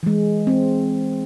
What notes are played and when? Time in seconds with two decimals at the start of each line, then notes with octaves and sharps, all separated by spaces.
0.03 E3 G#3
0.47 C4